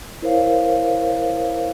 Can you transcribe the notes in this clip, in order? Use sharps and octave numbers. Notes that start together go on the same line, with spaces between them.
E4 A#4 C5 C#5 F5